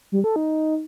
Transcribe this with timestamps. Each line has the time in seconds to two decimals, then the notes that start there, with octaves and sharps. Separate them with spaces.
0.12 G3
0.24 A4
0.36 D#4